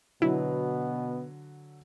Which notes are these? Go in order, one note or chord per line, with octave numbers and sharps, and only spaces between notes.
B2 D3 F#3 B3 E4